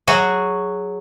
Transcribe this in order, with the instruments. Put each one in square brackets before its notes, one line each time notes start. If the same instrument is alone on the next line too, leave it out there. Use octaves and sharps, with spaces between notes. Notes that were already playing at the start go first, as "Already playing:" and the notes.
[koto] F#3 F#4 G#4